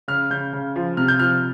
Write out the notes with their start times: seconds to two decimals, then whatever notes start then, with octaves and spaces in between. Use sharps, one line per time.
0.08 C#3 F6
0.30 C#3 G6
0.53 C#3
0.76 F3
0.97 C3 F6
1.08 G6
1.19 F3 F6